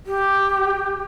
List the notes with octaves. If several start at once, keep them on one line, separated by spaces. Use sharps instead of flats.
G4